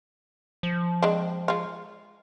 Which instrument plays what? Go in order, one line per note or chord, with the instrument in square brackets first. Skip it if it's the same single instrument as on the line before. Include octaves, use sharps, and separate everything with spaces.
[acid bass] F3
[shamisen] G#3 C4 D4
G#3 F4